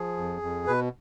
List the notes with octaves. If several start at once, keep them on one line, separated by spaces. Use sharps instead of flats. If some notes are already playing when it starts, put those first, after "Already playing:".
Already playing: F3 G#4
F2
F2
B2 B4